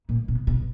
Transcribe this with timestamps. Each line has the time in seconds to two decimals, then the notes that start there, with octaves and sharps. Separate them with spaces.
0.09 A#2
0.28 B2
0.47 B2